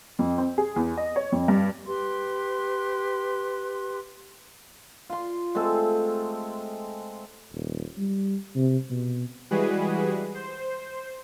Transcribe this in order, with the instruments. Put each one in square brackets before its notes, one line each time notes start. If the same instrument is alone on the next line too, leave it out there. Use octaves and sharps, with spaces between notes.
[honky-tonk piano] F2
C4
G#4
E2
D#5
C#5
F2
G2
[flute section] G4 B4 C6
[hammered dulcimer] F4 C6
G#3 A3 C4 A4
[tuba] D#1
G3
C3
B2
[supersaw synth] E3 G3 G#3 F#4 G#4 B4
C5